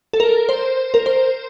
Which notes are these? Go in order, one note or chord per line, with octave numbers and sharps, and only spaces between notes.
A4
A#4
C5
A#4
C5